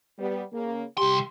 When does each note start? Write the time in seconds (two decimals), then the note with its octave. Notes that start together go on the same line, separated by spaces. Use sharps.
0.19 G3 B3
0.53 C#3 A#3
0.98 C2 G4 C6